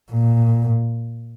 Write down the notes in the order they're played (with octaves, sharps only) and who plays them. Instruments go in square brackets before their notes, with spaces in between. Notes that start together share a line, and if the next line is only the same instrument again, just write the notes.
[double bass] A#2